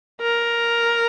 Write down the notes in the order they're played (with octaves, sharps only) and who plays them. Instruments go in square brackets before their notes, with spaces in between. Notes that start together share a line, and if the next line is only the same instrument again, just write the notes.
[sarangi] A#4